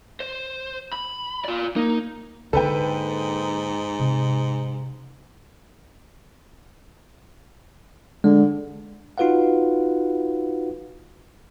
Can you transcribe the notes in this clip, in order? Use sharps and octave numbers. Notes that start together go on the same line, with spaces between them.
C5
B5
F4 D5
A#3 D#4
G#2 D3 A#3 A4 B4 G5
C3
D3 G#3
D#4 F4 F#4 B4 F5 F#5